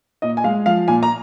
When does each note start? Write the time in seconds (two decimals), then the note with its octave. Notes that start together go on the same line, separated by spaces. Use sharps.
0.22 A#2 D#5
0.37 G#5
0.44 G#3 F5
0.66 F3 F5
0.88 A#2 G#5
1.03 A#5